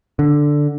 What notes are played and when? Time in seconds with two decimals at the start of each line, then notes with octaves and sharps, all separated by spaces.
0.19 D3